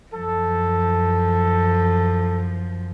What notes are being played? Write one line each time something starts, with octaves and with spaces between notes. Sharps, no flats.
F#2 F3 A4